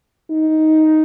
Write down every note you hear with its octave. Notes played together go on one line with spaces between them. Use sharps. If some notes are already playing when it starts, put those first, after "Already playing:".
D#4